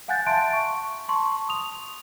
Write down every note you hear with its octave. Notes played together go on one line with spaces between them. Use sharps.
F5 F#5 G#5 F#6 G6 A6
E5 A5 C6 D7
C#6
A5 C6 C#6
D#6 F7